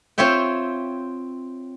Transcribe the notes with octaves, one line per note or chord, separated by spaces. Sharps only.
C4 F4 C#5 E5 G5